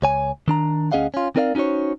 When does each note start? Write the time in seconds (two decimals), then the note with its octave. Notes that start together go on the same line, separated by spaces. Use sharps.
0.02 C#2 C#5 G#5
0.48 D#3 D4 A#5
0.92 D2 C#4 G#4 D#5 F5 F#5
1.14 C#4 F4
1.36 C4 D#4 A#4 D5 D#5 F5
1.55 C#4 D#4 F#4 C5 C#5